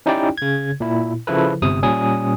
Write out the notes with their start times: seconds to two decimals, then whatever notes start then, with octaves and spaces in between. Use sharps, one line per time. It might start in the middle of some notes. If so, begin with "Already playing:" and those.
0.06 C#4 D#4 E4 G4 D5 G5
0.38 C#3 G#6
0.80 A#2 E4
1.27 C#3 F3 E4 A4 B4
1.62 G1 C3 D#6
1.82 A#2 G3 C#4 G#5 D#6